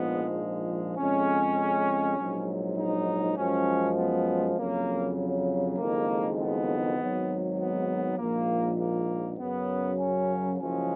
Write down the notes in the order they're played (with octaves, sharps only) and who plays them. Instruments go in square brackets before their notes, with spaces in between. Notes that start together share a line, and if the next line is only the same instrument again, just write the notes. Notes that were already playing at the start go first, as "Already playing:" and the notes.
Already playing: [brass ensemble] A#1 G#2 F3 G#3 B3
F2 C#3 G#3 C#4
A#1 G#2 F#3
D#4
F#2 F3 G#3 C#4
B3
F2 C#3 F#3 A#3
F#1 F2 D#3 G#3 A#3
B3
G#1 G#2 F#3
B3
A#1 G#2 F3 A#3
A#3
F#2 C#3 F#3 B3
C#4
F#1 F#2 F3 G#3 C#4